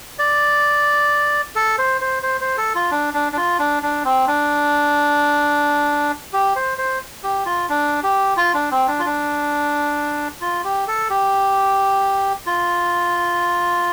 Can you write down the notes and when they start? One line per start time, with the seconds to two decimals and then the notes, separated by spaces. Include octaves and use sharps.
0.19 D5
1.56 A4
1.78 C5
2.01 C5
2.23 C5
2.41 C5
2.58 A4
2.75 F4
2.91 D4
3.14 D4
3.32 D4
3.37 F4
3.59 D4
3.83 D4
4.05 C4
4.28 D4
6.33 G4
6.56 C5
6.78 C5
7.23 G4
7.46 F4
7.70 D4
8.03 G4
8.37 F4
8.54 D4
8.72 C4
8.88 D4
8.99 F4
9.05 D4
10.41 F4
10.64 G4
10.88 A4
11.10 G4
12.47 F4